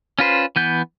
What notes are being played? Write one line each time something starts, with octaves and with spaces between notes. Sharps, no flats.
C#4 F4 B4 C5
E3 B3 G6